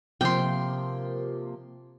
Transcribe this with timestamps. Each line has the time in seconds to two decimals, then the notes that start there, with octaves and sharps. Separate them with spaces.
0.21 C3 F3 A#3 G5 C6